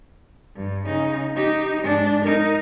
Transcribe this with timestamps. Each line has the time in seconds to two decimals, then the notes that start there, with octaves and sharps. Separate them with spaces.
0.56 G2
0.86 C#3 D#4
1.35 D#4 G4
1.82 G#2 D4
2.26 D#4 A#4